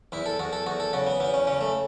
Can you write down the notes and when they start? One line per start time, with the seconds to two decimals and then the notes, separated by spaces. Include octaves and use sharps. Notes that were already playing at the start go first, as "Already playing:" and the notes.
0.12 E2 E4
0.26 A4
0.39 E2 F#4
0.53 A4
0.66 E2 F#4
0.80 A4
0.93 C#3 F#4
1.07 B3
1.20 E2 B3
1.34 C#4
1.47 C#3 C#4
1.61 A3